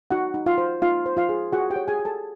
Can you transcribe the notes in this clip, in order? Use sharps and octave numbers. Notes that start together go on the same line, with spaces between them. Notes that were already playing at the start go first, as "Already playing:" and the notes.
D#4 F#4 F#5
D#4
F4 F5
C5
D#4 F4 F5
C5
F4 F5
G#4
F#4 G#4 F#5
G4 G5
C#5
G#4 G#5
G#4
A4 A5